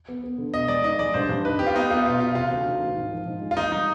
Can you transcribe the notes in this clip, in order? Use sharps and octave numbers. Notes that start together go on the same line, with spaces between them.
B3
B3
D3
B2 D#5
G#3 D5
D#4 D#5
G#3 D5
G2 C5
G2
D#4 B4
C4 G4
F4
B3 D#4
B3 F4
B2 F4
B2 F4
C3 F4
D2
D#3
D#3
G#2
F3
G#2
G#3
F4
D#3 D#4
G3 D#4